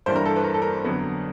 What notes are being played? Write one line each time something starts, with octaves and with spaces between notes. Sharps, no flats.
G2 E3 G3 A#3 D4 C5
A#4
A4
B4
A#4
A4
A#4
F2 D3 F#3 B3